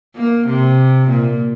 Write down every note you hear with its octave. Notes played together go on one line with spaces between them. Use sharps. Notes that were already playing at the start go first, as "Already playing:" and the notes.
A#3
C3
A#2